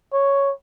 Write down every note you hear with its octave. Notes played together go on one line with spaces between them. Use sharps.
C#5